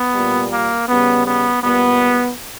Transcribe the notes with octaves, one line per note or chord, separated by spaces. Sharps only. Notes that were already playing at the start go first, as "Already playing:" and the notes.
Already playing: B3
A#2 G3
A#3
C#3 G3 B3
B3
A#2 G3 B3